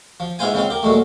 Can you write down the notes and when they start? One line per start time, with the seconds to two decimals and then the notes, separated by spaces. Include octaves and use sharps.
0.20 F3
0.39 G#2 B3 E4 F4 C5 G#5
0.54 C#3 G#3 B3 C4 F4
0.70 G4 A#4
0.83 A#2 F#3 G#3 A3